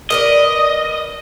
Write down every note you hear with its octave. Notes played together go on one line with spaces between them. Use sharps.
A#4 B4 D5 D#5